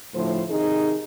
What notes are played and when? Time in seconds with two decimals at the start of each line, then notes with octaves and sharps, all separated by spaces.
0.14 D2 A2 F3 A3 C5
0.49 C3 D#3 D#4 G#4